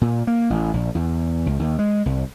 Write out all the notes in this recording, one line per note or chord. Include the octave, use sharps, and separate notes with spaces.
A#2
A#3
A1
A#1
E2
C#2
D#2
G#3
C2